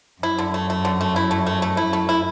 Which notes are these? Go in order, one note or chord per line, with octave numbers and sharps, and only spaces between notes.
F#2 E4
D3
A3
A3
D3
A3
E4
A3
A3
A3
E4
A3
E4